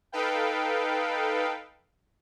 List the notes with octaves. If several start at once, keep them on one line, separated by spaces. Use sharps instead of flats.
D#4 A4 B4 F5 G5